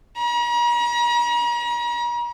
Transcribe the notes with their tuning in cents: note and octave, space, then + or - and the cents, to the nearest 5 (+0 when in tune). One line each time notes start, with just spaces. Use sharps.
A#5 +40